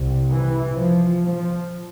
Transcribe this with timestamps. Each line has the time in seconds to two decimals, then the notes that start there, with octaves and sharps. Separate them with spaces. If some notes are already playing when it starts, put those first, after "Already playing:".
Already playing: C2 C3
0.31 E3
0.76 F3
1.22 F3